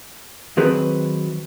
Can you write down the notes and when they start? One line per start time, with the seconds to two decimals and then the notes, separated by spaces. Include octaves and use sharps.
0.57 D#3 F#3 C4 G#4 B4